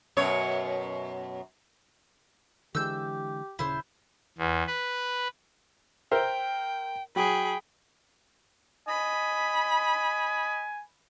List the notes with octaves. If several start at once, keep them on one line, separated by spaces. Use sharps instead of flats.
F#2 B2 C#5
D3 E3 G#3 G4 E6 G6
D#1 C#3 E4 C5
E2
B4
A#4 C5 E5 G5
F#3 G#4 G5 B5
D#5 G#5 B5